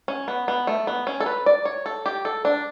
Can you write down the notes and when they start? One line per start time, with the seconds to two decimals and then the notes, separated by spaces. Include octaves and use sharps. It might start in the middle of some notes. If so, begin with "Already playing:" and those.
0.08 C#4
0.28 B3
0.48 B3
0.67 A3
0.87 B3
1.07 C#4
1.20 A4
1.26 B4
1.46 D5
1.65 C#5
1.86 A4
2.06 G4
2.25 A4
2.45 D4